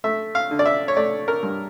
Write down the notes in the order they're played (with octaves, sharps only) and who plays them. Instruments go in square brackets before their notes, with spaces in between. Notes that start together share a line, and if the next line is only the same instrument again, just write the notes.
[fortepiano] A3 E5
F5
D3
D5
E5
C#5
A3 D5
A#4
G2